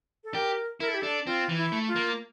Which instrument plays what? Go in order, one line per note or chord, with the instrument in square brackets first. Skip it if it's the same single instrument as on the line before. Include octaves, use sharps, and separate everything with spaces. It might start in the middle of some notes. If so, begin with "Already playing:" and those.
[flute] A4
[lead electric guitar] G4 [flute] A#4
[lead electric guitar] E4 [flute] A#4
[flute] A4
G4
[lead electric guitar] D4 [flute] A4
[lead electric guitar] C4 [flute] F4
[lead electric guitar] E3
[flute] E4
[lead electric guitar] A3
[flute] F4
[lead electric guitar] A#3